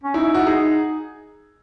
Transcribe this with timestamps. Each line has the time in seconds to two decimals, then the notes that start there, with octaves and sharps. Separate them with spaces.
0.03 C#4
0.14 D#4 E4
0.34 F#4
0.46 D#4 G#4